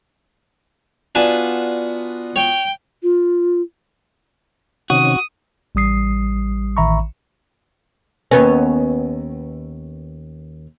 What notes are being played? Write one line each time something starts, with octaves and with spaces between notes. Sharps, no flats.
B3 D4 F4 F#4 G#5 A5
C#5 G5
F4
C3 D#3 C#4 F#4 D#6
A1 G3 D#6 C7
A1 D#3 E5 A#5 B5 C#6
D#2 B3 C#4